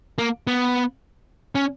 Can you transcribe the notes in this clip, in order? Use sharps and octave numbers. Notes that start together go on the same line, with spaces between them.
A#3
B3
C#4